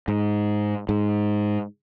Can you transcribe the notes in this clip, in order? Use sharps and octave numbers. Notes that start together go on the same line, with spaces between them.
G#2
G#2